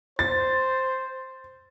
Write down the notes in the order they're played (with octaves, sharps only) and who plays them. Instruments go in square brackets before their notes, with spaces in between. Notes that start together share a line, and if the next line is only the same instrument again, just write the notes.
[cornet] C5 [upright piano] A6